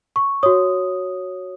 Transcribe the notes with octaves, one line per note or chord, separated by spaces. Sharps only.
C#6
F#4 C#5 D#6